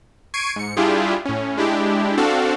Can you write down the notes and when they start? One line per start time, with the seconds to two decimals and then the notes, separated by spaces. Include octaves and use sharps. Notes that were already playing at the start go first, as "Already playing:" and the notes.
0.34 C#6 G#6 C7 D7 D#7
0.56 G#2 C#7
0.77 G3 D4 E4 F4 G4 G#4
1.25 A2 C#4
1.57 G#3 D4 E4 G4
2.17 C4 D4 F#4 A4 F5